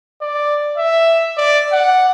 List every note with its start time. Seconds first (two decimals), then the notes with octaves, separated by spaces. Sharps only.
0.21 D5
0.77 E5
1.37 D5
1.72 F#5